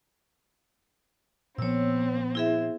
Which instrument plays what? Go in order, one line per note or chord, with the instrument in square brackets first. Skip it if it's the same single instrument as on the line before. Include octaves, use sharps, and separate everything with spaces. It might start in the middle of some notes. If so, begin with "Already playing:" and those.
[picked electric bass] A#2 F3 [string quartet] B3 C4 [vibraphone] C#5 E6
[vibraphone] E4 G#4 E5